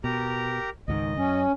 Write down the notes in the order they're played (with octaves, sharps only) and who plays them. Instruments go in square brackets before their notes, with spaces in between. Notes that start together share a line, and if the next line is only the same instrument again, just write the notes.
[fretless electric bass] B2 [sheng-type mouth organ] G4 A#4 A#5
[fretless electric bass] C#2 G#2 D#3 [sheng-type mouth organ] D#5
[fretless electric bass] F#2 [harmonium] C#4